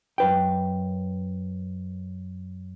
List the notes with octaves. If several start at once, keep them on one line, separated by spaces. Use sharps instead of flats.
F#2 B4 G5